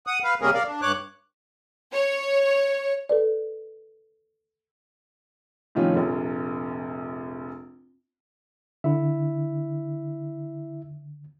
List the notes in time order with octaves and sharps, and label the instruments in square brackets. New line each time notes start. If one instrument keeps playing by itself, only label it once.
[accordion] F#5 D#6
B4 F5
C3 G3 A#3 C#4 G#4 A#4
A#4 D5 F5
D4
G2 C#5 D6 F#6
[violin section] C#5
[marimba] A4 B4 D5
[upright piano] A2 C3 D#3 F3 C#4 F4
F1 A#1
[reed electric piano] D3 [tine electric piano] E4 E5